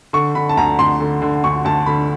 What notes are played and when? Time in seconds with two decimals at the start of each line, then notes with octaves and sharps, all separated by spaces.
0.13 D3 C#6
0.35 D3 B5
0.49 A5
0.57 D2 A#5
0.79 D2 C6
1.00 D3
1.22 D3
1.43 D2 C#6
1.65 D2 A5
1.86 D3 B5